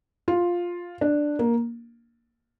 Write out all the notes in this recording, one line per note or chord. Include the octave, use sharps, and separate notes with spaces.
F4
D4
A#3